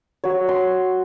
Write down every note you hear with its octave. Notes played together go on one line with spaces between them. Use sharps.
F#3 C#5
C6